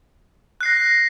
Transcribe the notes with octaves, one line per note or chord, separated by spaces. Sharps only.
F#6 A#6 C7